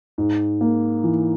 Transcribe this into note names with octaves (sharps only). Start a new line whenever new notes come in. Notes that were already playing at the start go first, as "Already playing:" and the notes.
G#2
A#3
E3